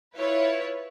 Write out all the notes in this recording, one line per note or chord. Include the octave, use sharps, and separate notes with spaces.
E4 F4 B4 C#5